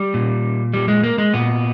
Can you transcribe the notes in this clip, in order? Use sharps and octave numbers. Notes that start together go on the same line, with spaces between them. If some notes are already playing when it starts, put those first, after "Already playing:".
Already playing: G3
A#2
G3
G#3
A#3
G#3
A#2 B3